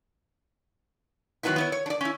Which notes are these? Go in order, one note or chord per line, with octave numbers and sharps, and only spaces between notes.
D#3 F#3 G#3 B3 D#4 E4
B3 E4 C#5
C#5
D4 D5
C#4 E4